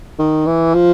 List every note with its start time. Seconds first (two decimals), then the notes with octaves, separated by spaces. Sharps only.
0.19 D#3
0.46 E3
0.74 F3